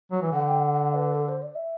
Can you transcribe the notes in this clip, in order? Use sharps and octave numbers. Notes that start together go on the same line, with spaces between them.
F#3
E3
D3 F#5
G5
F#5
F#5
B4
A4
C5
D5
E5